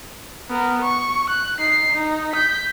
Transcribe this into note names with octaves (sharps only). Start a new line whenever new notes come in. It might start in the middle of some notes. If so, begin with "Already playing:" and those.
B3 A#4
C#6
F#6
D#4 C7
D#4
G6 B6